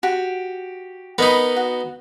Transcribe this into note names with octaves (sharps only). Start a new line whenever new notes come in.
F#4 G4
B3 D#4 A#4 D#5 B5
F#4